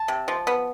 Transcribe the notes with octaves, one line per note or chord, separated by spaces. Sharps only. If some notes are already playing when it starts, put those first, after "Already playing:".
Already playing: A5
C3
F3
B3